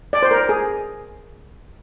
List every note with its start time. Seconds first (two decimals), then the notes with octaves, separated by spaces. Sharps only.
0.13 D5
0.23 C5
0.31 A#4
0.49 G#4